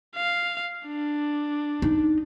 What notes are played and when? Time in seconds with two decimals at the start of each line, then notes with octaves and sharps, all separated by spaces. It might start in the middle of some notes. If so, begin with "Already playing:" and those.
0.16 F5
0.86 D4
1.82 D#4